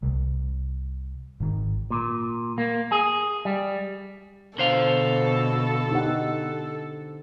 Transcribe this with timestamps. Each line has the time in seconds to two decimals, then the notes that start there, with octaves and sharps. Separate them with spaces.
0.03 C2
1.40 G#1 D#3
1.90 A#2
2.58 A#3
2.92 G#4
3.45 G3
4.58 B2 D3 A4 C5 F5
5.92 D#4 G4 F#5